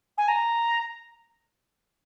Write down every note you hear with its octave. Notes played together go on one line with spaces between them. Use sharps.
G#5
A#5